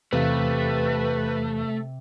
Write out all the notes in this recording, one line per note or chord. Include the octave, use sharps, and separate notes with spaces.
E2 C3 E3 A3 B4 F5